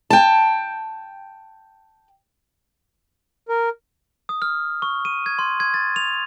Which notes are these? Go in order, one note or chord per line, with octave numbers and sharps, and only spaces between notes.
G5 A5
A#4
D#6
F6
C#6
D#7
G#6
C6
G#6
A6
F7